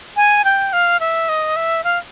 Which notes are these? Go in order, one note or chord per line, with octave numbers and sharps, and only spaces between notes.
G#5
G5
F5
E5
D#5
E5
F5